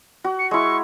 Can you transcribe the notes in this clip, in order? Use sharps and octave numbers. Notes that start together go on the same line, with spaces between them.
F#4
C#7
G#3 E4 C#6